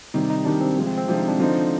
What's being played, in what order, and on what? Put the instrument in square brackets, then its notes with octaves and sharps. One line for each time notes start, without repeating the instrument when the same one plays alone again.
[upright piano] C3 D#3 G3 [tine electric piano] D#4
[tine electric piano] D#4
[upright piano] C3 D#3 G3 [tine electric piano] D4
[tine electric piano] C4
[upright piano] C3 F3 G#3
[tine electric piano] C4
C4
[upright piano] C3 F3 G#3 [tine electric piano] D4
[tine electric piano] D#4
D4
[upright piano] D3 F3 C4 D#4